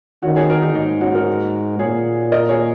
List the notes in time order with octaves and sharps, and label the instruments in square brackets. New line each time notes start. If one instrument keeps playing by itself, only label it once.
[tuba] D#3 [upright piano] C#4 F#4
[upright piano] G#4 C#5
F#4 A#4
D#4 G#4
[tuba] G#2 [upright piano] D#4
[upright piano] C#4 F#4
F#4 A#4
[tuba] A#2 [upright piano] G#4 C#5
[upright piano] A#4 D#5
G#4 C#5